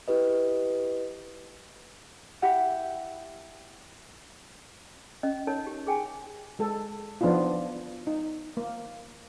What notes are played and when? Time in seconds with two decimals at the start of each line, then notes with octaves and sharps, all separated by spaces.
0.08 E4 G4 B4 D#5
2.42 E4 G4 F#5
5.23 C#4 D#5
5.47 D#4 A#4 C#5 A5
5.67 G4
5.87 G#4 G5 G#5
6.59 G#3 A4
7.21 F3 B3 D4 D#4 F4
8.07 D#4
8.57 A#3